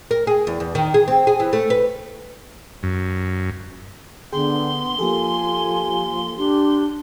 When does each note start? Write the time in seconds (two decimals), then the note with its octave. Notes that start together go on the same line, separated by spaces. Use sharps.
0.11 A#4
0.27 G#4
0.47 E2
0.60 E2
0.75 D#3
0.94 G#4
1.08 C4
1.27 G#4
1.40 E3
1.53 A3
1.70 B4
2.83 F#2
4.32 D3 B3 G#4 G5 C6
4.99 F3 A#3 G4 A4 G#5
6.37 D4 G4 C6